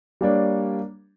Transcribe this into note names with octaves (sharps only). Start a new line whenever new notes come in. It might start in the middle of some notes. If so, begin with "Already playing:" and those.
G3 A#3 D4 C#5